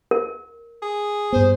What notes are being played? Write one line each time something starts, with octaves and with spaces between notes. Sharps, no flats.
A#4
G#4
G2 B3 C5